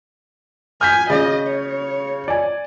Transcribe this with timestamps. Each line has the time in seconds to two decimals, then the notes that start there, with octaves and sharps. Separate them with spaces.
0.81 G#5 F6 G6 B6
1.10 C#3 D#5
1.48 C#5
2.28 D5 G#5